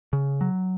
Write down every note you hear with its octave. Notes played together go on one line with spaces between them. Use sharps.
C#3
F#3